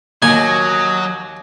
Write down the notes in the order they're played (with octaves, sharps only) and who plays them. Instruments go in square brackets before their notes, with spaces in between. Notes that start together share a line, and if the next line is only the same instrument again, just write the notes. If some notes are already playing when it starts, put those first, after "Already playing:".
[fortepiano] D#2 [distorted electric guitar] F#3 [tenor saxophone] D#5 [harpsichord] G#5